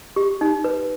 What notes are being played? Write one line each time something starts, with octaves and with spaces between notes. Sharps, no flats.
G4
D#4
B4